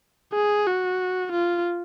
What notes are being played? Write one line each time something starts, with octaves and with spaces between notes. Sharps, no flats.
G#4
F#4
F4